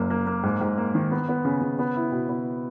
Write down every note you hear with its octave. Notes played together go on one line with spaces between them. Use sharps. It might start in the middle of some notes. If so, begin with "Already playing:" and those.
Already playing: F#1 A#3
A#3
A#3
G#2
G#2
A#3
D#3
B3
B3
C#3
C#3
B3
E4
B2
B3